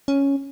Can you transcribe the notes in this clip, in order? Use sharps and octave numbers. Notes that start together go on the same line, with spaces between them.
C#4